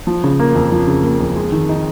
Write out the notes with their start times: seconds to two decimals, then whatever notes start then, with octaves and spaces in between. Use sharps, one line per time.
0.07 F3
0.24 C#3
0.40 A#3
0.55 F2
0.72 F3
0.87 C#3
1.03 A#3
1.19 F2
1.36 G#3
1.52 D#3
1.69 D#4